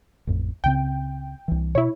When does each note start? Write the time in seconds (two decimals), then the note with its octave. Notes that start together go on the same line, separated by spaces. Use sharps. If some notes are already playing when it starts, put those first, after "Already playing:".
0.27 A1 F2
0.64 C#2 C#3 C4 G5
1.48 C2 E3
1.75 B2 E4 C#5